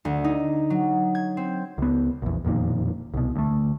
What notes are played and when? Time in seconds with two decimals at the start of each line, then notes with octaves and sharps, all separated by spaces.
0.05 D2
0.24 D#4
0.70 F#3
1.15 G#6
1.37 C4
1.78 C#2 B3
2.22 A#1 E2
2.45 E1 F2 A#2 D#3
3.14 C2 B2
3.36 D2 A3